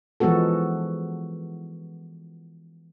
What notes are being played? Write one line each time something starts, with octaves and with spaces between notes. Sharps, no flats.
E3 F3 G#3 B3 F#4 A4